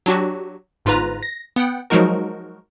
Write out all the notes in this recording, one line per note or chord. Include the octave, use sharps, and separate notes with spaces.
F#3 D4 F#4 G4
G1 G#2 F4 B4 A#5
A#6
B3 F#5 G5
F3 F#3 G#3 D#4 F#4 A#4